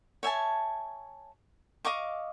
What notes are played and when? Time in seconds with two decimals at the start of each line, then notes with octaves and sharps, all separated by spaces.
0.23 C#5 E5 G#5 A5
1.85 D#5 F5 C#6 D6